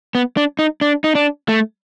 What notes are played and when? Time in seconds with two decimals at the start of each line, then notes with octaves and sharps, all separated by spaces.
0.15 B3
0.37 D4
0.59 D#4
0.81 D4
1.04 D#4
1.15 D4
1.48 A3